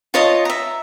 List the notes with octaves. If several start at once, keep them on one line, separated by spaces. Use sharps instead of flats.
F4 C#5 D#5 A5
E5 A#5